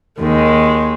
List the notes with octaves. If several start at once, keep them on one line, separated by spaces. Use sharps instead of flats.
D#2 D#3 G#3